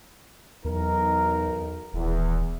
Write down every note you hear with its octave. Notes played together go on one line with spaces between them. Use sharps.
B1 E2 D#4 A#4
D#1 E2